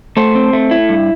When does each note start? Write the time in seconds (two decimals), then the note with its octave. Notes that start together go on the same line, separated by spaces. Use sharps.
0.17 A3 A4 C5
0.35 C4
0.53 A3
0.71 E4
0.89 G2